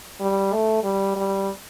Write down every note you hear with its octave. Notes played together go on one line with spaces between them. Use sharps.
G3
A3
G3
G3